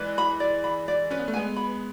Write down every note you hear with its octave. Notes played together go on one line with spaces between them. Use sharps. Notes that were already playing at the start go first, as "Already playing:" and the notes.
Already playing: E3 G#3 B4 D5
B5
D5
B5
D5
C#4 B4
B3
A3
G#3 B3 G#5
B5